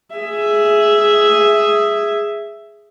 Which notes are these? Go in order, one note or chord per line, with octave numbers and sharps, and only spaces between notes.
G#4 E5